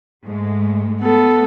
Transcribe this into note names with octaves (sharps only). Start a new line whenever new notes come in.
G#2 G#3 A3
A3 B3 A4